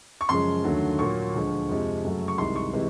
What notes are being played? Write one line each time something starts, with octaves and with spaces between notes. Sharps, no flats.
C#6
F#2 C#3 F3 G#3 C6
D#2 D3 F#3 A3
A#2 F#3 A#3 C#6
D2 D3 F3 G#3
F2 C3 F3 G#3
F#2 C#3 F#3 A3
C#6
C2 C3 D#3 G#3 C6
C#6
C3 E3 G#3